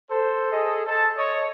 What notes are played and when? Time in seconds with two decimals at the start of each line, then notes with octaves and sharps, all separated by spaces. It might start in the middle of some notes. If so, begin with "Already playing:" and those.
0.11 A4 C5
0.52 G#4 D#5
0.87 A4 C5 A5
1.18 C#5 D#5 C#6